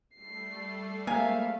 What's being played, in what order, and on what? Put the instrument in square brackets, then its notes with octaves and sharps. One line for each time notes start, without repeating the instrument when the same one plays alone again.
[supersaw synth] G3 A3 A4 [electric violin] C7
[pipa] C3 A#4 G#5 [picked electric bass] G#3 A#3 [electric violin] E5 F5